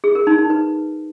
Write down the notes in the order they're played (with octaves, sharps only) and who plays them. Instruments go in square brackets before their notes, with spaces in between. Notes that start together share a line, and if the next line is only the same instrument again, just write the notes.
[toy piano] G#4
A#4
D#4
D#4
B4